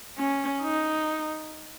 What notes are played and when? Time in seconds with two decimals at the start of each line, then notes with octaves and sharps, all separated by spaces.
0.18 C#4
0.62 D#4